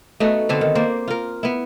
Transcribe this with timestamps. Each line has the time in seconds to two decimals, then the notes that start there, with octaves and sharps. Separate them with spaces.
0.20 A3 B3 D#4 F#4
0.49 D3 B3 C4 A4
0.61 D#3
0.75 A#3 C5 D5
1.08 F4 A#4
1.43 B3 E4